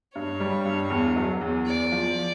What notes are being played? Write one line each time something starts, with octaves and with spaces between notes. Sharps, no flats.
G2 C#5
G3
G2
E2
F#3
E2
E2 D5
F3